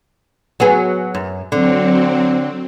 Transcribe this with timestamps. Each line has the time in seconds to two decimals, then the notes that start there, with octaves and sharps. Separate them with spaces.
0.60 F#3 B3 G#4
1.15 F#2
1.52 D3 F#3 C4